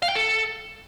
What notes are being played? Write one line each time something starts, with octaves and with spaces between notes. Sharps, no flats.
F5
G5
A4